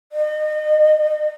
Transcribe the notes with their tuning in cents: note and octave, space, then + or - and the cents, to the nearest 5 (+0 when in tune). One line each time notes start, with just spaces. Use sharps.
D#5 -35